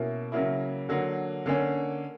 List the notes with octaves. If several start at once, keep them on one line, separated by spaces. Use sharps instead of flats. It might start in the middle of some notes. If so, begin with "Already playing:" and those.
Already playing: B2 A#3 C#4 E4
C#3 F#3 A#3 E4
D3 F#3 A#3
D3 A#3 C#4